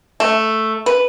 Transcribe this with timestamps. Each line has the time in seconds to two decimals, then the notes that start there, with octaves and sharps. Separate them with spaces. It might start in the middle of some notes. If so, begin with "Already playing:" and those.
0.20 A3
0.86 B4